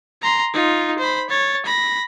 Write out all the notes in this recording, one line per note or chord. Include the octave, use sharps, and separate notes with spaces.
A#5 C6
D#4 F4
C5 B5
C#5 A6
B5 A#6